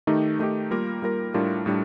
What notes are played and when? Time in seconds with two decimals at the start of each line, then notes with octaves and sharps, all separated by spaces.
0.07 D#3 A3 D#4 G4
0.39 D#3 A3 D#4 G4
0.71 G3 A#3 F4 A#4
1.02 G3 A#3 F4 A#4
1.34 A2 G3 D4 F4 A#4
1.66 A2 G3 D4